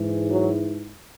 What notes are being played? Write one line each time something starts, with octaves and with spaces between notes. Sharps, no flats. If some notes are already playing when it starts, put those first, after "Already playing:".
Already playing: G#2 E3
F#3